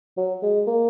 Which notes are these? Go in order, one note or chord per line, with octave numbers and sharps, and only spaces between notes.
F#3
G#3
A#3